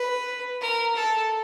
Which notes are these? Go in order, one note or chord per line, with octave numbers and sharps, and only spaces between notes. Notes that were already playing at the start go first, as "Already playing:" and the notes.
Already playing: B4
A#4
A4